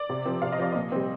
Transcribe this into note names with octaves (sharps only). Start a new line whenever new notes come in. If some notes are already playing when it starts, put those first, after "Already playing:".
Already playing: D5
C3
F3 C4
C3 F5
D#5
F3 C4 D5
A#2 D#5
G3 C4